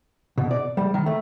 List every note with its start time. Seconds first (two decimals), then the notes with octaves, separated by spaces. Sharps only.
0.38 B2
0.51 D5
0.77 G3
0.94 D#3
1.06 A3